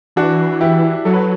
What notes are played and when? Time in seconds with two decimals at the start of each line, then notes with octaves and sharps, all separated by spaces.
0.16 E3 D4 F#4
0.61 E4 G4
1.05 F#3 A4
1.14 B4